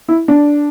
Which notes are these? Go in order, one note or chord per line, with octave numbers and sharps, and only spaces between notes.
E4
D4